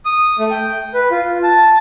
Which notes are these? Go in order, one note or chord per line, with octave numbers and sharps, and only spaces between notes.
D#6
A3
G5
B4
F4
A5